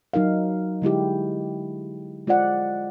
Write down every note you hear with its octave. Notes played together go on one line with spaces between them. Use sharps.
F#3 D#4 A#4 F5
D3 G#3 E4 G4
G#3 F4 C5 D5 F#5